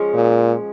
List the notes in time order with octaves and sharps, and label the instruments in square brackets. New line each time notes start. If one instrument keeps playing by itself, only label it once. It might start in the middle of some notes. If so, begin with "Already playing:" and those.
Already playing: [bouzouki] F3 G#3 C#4
[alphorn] A#2